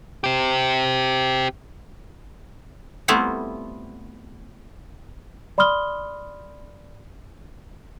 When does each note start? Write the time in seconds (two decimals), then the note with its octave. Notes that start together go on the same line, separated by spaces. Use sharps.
0.24 C4 G4
3.08 G3 A3 B3 C4 E4 F4
5.58 D5 B5 C6 D#6 F6 G7